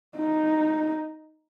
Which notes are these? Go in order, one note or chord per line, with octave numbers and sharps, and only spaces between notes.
D#4